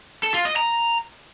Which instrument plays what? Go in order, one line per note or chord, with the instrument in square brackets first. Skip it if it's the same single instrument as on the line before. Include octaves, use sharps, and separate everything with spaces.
[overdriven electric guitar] A4
F4
D#5
A#5